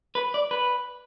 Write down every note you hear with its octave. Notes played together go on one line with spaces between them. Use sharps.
B4
D5
B4